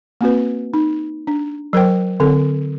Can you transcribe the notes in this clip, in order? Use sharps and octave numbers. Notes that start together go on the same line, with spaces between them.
A#3 C4 F#4 B4
D#4
D4
F#3 A#4 C5 G5
D3 C4 A4